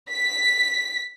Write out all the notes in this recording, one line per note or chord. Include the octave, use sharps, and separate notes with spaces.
B6